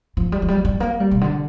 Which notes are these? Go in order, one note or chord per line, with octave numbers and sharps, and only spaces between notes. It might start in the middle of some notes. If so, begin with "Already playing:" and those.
F3
G3
F3
G3
G3
A#3
G3
C3
D3